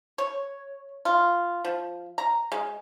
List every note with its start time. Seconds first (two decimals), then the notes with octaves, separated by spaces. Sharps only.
0.18 C#5
1.05 F4
1.64 F3
2.18 A#5
2.52 G#3